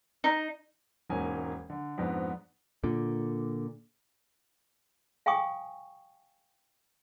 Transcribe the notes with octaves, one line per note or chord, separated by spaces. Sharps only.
D#4
E1 G#2 A#3 C#4 G#5
D3
F2 G#2 B3 D4
A#2 D3
F5 G5 G#5 C#6 D#6